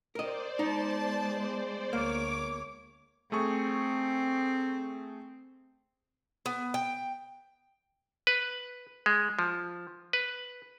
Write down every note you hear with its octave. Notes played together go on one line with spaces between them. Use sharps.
A#4 C5 D5 D#5
G#3 B3 D#4 A5
D2 A#3 C#5 D6
A3 C4 G#4 C#6
B3
G5
B4
G#3
F3
B4